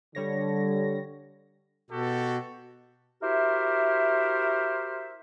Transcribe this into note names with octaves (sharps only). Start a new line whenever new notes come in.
D3 G3 C#5 A#6
B2 F#4 G4 A4
E4 F#4 G4 A#4 C5 E5